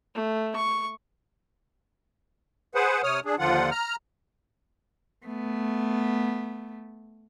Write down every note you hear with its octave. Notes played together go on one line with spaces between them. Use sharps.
A3
C#6
G#4 B4 C5 F#5
C3 C#5 D#6 F6
D4 G#4
D#2 D3 F3 F4 F#5
A#5 F6
A3 B3